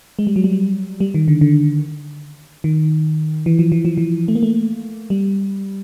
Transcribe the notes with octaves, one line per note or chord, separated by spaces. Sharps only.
G#3
G3
F#3
G3
G3
D#3
D3
D3
D#3
E3
F3
E3
F3
E3
A3
A#3
A3
G3